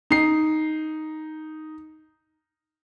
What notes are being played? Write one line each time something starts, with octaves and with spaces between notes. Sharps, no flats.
D#4 C7